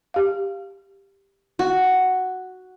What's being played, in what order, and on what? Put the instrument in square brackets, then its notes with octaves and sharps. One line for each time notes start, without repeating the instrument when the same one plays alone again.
[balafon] G4 F5
[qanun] F#4